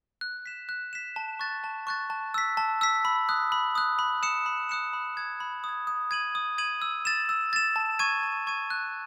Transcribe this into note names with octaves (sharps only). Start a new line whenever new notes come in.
F#6
B6 E7
F#6
B6 E7
A5
C#6 F#6 A6
A5
C#6 F#6 A6
A5
E6 B6
A5
E6 B6
B5
D#6 F#6
B5
D#6 F#6
B5
D#6 F#6 C#7 E7
B5
D#6 F#6 C#7 E7
B5
D#6 G#6
B5
D#6 G#6
D#6
G#6 D#7 F#7
D#6
G#6 D#7 F#7
E6
A6 E7
E6
A6 E7
A5
C#6 G#6 D#7
A5
C#6 G#6 D#7
F#6